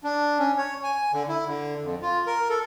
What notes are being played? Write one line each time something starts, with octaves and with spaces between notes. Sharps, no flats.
D4
C#4
C#5
G#5
D3
E4
D3
F2
F4
A#4
A4